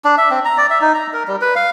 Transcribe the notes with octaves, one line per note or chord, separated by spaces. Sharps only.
D4
E5
C4
A#5
D5
E5
D#4
A#5
A#4
G3
B4
F5